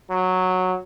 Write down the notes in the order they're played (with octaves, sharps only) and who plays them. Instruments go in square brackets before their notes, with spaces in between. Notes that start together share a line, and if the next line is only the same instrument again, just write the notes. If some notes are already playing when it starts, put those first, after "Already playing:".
[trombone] F#3